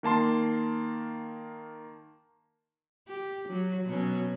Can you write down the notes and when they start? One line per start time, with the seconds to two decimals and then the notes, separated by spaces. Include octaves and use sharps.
0.03 D#3 A#3 A5 C6
3.08 G4
3.48 F#3
3.86 B2 F#3 C#4